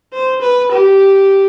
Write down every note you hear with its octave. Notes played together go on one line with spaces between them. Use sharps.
C5
B4
G4